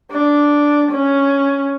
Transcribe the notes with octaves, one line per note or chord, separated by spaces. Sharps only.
D4
C#4